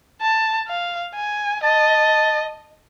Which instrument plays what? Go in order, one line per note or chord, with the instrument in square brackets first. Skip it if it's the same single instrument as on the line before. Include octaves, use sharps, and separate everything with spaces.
[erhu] A5
F5
G#5
[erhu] D#5 [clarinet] A5